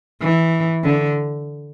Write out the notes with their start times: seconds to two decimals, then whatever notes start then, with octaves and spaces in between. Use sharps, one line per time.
0.22 E3
0.84 D3